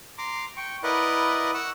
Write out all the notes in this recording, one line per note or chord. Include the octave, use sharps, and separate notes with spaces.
A#5 C6 D6
G5 C#6
E4 A#4 B4 D5 D#5 F#5
F#5 C#6 E6